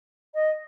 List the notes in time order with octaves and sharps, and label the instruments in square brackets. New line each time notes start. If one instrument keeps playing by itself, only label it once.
[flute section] D#5